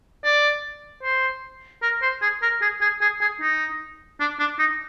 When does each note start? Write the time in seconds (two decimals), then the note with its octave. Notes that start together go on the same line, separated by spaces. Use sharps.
0.25 D5
1.03 C5
1.83 A#4
2.02 C5
2.22 G#4
2.42 A#4
2.62 G#4
2.82 G#4
3.02 G#4
3.21 G#4
3.41 D#4
4.20 D4
4.39 D4
4.59 D#4